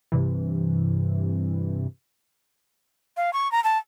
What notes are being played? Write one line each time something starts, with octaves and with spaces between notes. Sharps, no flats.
G2 C3 E3
F5
C#6
A#5
A5